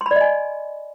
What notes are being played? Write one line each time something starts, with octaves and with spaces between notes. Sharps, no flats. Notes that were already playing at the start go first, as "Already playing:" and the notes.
C6
B5
D5
D#5
G#5